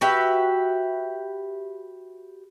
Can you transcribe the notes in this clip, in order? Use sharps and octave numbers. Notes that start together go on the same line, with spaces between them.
F#4 G4 B4 E5